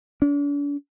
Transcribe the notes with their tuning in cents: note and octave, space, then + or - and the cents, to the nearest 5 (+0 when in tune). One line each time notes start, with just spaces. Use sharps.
D4 -40